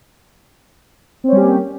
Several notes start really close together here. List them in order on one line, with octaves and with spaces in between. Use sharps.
C4 C#4 G3 G4 A#3